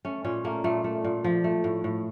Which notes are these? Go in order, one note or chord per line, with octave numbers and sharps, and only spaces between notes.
A3 C#4
A#2 C#4
A3 A#3
A#2 A3
A3
A#2
F3
A3
A2
A2